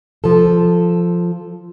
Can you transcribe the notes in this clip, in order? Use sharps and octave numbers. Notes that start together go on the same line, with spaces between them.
F3 A4